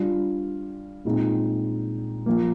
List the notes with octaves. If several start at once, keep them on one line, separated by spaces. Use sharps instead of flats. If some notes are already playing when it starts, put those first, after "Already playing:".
Already playing: G3 D4 F4
A#2 G#3 C4 D#4
F3 A#3